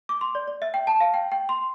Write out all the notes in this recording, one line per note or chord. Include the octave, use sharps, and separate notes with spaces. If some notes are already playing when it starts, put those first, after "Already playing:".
D6
C6
D5
D5
E5
G5
A5
F5
G5
G5
C6